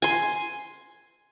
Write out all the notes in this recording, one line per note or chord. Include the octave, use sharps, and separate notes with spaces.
G#5 C6